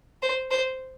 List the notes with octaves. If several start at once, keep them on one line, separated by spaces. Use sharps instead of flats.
C5
C5